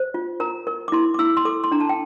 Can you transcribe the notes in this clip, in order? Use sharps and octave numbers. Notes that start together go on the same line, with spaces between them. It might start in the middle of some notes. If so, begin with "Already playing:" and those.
Already playing: C5
F4
A#4 A#5
A#4
D6
E4 C6
D6
E4 E6
C6
A4 D6
C6
D4 A#5
A5
G5